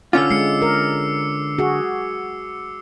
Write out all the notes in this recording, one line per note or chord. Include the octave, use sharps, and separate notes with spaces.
D3 C#4 F4 D6 E6
G#3 C7 C#7
A#4
F#4 G#4